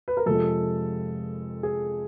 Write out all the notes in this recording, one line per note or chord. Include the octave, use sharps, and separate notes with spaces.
B4
A#4
F2 C3 F3 G#3 A4
G#4